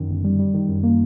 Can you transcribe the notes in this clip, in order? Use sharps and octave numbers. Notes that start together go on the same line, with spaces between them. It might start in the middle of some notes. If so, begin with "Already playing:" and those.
Already playing: F#2 D#3
G1
G3
G3
D#3
F#2
A#3